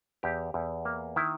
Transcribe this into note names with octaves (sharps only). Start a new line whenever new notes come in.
E2 G4
E2
A#3
D#3 E4